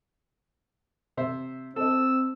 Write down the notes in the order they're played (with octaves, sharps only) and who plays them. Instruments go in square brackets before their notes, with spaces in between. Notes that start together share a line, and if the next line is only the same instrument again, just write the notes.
[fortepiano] C3 C5 E5
[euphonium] C4 [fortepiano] A4 D#5 [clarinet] E6